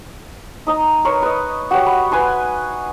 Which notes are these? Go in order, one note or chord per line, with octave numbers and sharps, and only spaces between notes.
D#4 D#5 A#5
A#4 B4 C#5 C6
B4 D#5
F#4 G4 C#5 F#5
B5
B4 G#5 B5 C6